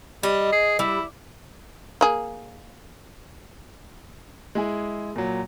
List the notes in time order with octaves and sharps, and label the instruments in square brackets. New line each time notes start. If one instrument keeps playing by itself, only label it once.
[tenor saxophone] G3 [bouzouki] D#5
[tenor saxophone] G#4
[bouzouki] G3 [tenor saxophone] E4
[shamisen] A#3 G#4
[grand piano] G#3 E4 G#4
A#2 F#3